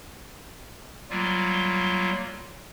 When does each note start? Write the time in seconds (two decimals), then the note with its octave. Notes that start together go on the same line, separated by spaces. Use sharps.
1.10 F#3 G3 A#3 F4